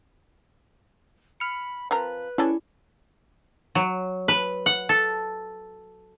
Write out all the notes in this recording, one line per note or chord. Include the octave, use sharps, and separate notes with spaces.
B5 F6 C#7
F3 C4 A#4 B4
C#4 E4 G#4 A4 D5
F#3
B4
F#5
A4